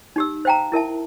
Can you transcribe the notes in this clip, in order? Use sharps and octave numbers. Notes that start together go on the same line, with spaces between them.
D#4 G4 E6
C5 F5 G5 A5 A#5
E4 A#4 E5 A5